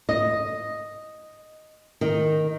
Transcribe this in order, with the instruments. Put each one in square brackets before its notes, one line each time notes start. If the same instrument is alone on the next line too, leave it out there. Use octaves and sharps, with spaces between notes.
[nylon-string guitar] D#5
D#3